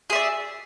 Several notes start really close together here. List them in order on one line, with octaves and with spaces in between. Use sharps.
G#4 E5 D5